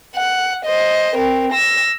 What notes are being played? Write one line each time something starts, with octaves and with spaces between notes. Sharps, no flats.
F#5
C5 D#5
C4 A#4
E6 A#6